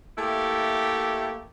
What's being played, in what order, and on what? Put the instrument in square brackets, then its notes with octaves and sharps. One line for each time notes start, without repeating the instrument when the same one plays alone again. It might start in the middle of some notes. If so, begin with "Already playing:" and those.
[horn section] A3 A#3 E4 G4